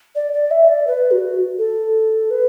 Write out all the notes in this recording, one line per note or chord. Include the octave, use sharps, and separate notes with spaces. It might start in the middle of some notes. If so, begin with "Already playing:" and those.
D5
D5
E5
D5
B4
F#4
A4
B4